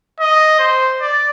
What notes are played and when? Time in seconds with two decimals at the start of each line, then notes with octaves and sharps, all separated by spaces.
0.20 D#5
0.59 C5
1.01 D5